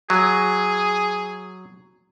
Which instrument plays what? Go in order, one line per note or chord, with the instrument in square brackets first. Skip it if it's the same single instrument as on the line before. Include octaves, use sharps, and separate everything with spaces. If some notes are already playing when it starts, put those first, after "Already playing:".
[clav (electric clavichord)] F#3 [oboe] G#4